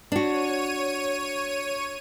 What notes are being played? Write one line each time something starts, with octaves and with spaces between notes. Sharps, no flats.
D4 F#4 C#5 D#7